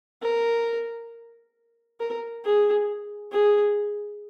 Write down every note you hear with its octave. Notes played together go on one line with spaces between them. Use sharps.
A#4
A#4
G#4
G#4